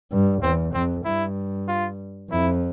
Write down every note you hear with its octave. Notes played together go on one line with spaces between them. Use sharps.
G2
E2 C4
F2 C4
G2 E4
F4
F2 E4